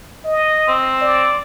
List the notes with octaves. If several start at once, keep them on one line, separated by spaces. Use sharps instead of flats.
D#5
C4
D5